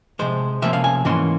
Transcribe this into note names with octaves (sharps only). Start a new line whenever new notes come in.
C3 F3 G#3 C5
C3 F3 A#3 C#4 E5
F5
G#5
G#2 E3 A#3 C#4 C6